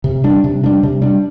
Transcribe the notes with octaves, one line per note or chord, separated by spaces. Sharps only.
C3
G3 D4
C3
G3 D4
C3
G3 D4